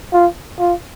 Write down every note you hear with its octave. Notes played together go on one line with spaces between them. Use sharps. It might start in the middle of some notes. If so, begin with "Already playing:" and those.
F4
F4